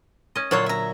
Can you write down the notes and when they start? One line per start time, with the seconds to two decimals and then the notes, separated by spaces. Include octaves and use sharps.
0.36 C#4 D#5
0.51 A#2 D3 F#3 F4 C#5 F#5
0.66 E5 A#5